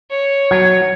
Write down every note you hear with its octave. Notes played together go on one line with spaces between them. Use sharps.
C#5
F#3 G#6